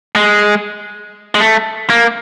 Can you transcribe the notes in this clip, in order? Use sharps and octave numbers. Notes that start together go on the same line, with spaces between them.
G#3
G#3
A3
A#3